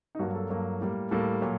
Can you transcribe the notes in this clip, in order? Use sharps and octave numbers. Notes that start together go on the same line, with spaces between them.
D#4
G2 F#3 A#3 F#4
A4
G2 F#3 A#3
A2 G3 A#3
A2 G3 A#3 A4
A#2 F#3